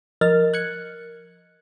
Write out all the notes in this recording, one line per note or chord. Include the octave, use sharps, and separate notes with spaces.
F3 A#4 D#5 F6 A6
F#6 G#6 C#7